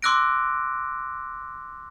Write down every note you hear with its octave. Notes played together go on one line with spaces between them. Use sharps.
C6 D6 E6 F#6 A#6 D7